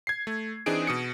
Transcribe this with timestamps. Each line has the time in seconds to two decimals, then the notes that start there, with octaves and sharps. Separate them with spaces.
0.07 G#6 C7
0.27 A3
0.66 E3 C4 D4 D#4 G#4 D7
0.87 B2 D#6 C#7